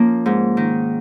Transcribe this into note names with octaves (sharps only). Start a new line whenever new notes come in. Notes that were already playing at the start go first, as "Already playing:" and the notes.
Already playing: F3 A#3 C#4
G#2
D#3